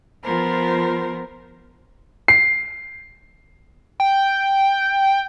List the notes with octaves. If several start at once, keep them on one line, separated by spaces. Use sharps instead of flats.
F3 B3 F4 A#4 C5
C7
G5